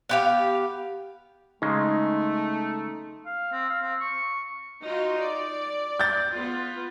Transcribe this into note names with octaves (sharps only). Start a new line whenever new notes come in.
B3 G4 F5
C#3 G#3 A3 D#4 C6
F5
C4
F5
C4
C#6
D#4 F4 F#4
D5
G6 A6
B3 F4